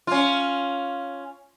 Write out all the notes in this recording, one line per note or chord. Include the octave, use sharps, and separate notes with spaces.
C#4 F4